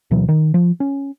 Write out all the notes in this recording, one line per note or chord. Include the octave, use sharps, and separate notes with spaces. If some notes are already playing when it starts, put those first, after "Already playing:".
D2 B2 E3 F#3
D#3
F3
C#4